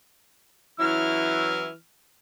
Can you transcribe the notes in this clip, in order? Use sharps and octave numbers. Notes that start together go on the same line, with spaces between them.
E3 F#3 C#4 E4 F6